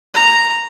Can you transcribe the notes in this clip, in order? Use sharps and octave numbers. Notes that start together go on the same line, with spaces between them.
A#5